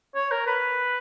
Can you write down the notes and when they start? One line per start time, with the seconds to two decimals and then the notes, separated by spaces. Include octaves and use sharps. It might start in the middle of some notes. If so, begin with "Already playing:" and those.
0.15 C#5
0.31 A#4
0.46 B4